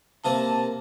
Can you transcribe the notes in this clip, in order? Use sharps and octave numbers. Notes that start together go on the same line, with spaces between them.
C3 A#3 A5